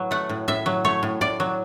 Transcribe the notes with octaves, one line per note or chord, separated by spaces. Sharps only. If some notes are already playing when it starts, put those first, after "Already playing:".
Already playing: A2 F#3 B4
A3 F#5
A2
A2 E5
F#3
A3 C#5
A2
A2 D5
F#3